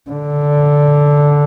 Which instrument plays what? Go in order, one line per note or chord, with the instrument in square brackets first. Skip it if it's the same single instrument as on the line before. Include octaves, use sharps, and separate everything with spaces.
[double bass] D3